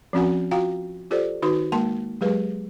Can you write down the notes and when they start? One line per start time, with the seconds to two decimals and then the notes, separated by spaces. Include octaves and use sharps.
0.13 F3 C4 C#4 F#4 F#5 G#5
0.51 F4 F#4 F5 G5 A#5
1.11 F4 G4 A4 C5 D5
1.42 D#3 D#4 F#4 B4 C6
1.72 G#3 A#3 A#4 A5 C6
2.21 F#3 G#3 G4 G#4 B4